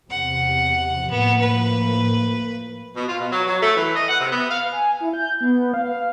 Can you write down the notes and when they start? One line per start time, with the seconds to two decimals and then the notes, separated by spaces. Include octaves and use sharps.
0.10 E2 C3 F#5
1.10 A2 F3 A#3 B3
1.41 B4
2.96 B2
3.08 F4
3.20 B2
3.31 F#3
3.47 F#3
3.62 A3
3.76 E3
3.95 D#5
4.09 F#5
4.21 C3
4.32 B3
4.50 F5
4.72 G#5
5.01 E4
5.13 G6
5.41 B3
5.74 F5